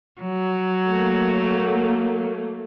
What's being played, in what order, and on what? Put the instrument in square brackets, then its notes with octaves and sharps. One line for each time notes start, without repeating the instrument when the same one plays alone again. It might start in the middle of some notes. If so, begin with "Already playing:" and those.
[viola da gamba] F#3
[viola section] A3 A#3